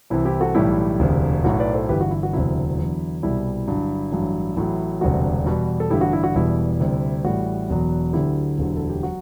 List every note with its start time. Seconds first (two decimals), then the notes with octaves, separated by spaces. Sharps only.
0.10 C2 C3 E3 E4
0.25 E4 G4
0.40 F#4 A4
0.55 B1 A2 E3 G3 E4 G4
1.00 E1 D2 C3
1.44 B1 A2 F#3 F#4
1.60 B4 D5
1.74 A4 C5
1.89 G1 G2 E3 G4 B4
2.01 F#4
2.11 E4
2.23 F#4
2.33 E1 D2 C3 F#3 E4
2.78 E2 D3 F#3
3.22 C2 B2 G3 E4
3.67 G1 G2 F#3
4.12 A1 G2 F#3
4.56 A1 A2 F#3
5.01 E1 D2 C3 G3 F#4
5.45 E2 B2 G3
5.80 A4
5.90 A1 G2 D3 E4 G4
6.01 F#4
6.13 E4
6.24 F#4
6.35 E1 E2 B2 G3 E4
6.80 D2 C3 G3
7.24 A1 A2 G3 F#4
7.70 E1 E2 B2 F#3
8.13 D2 D3 F#3 E4 G4
8.58 E1 D2 D3 F#3
8.77 A4
8.90 G4
9.03 F#3 F#4